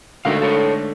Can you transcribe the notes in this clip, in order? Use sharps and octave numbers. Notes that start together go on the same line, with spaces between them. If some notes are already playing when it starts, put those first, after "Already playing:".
G#2 D3 A3 F#4 A#4 F5
A4 C#5